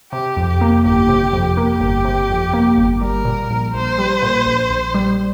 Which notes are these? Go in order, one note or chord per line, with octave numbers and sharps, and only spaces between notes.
C3 G4
F2
G4
A#3
G1 G4
C3
F2
A#3 G4
G1
C3
F2
A#3
G1
G3 A#4
A#2
A#1
A#1 C5
G3
A#2
A#1
A#1
G3